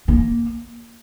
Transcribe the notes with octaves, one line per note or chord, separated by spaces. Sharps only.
A#3